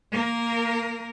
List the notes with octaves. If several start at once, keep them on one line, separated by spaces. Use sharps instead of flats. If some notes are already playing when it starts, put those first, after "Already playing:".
A#3 A#4